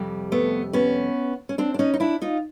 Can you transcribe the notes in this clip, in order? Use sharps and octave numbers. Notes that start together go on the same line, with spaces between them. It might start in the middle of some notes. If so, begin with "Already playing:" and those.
Already playing: F2 C3 G3
A3 B3
B3 C#4
C#4
C4 D4
D4
C#4 D#4
D#4
D4 E4
D#4 F4